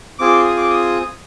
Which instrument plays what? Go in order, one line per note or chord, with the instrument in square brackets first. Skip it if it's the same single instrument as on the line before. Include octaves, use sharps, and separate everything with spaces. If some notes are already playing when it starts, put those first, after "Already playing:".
[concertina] C4 F4 G#4 D6
D#6
D6
D#6